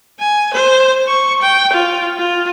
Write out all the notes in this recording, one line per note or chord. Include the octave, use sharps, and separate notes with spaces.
G#5
C5
C#6
G5
F4
F4